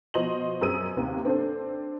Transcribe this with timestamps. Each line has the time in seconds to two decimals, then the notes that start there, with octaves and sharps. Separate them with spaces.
0.14 B2 F3 C5 D#5 C6 F#7
0.61 F#2 C4 G#4 D#6 E6 D#7
0.97 D#2 C3
1.25 C4 D4 A4 C5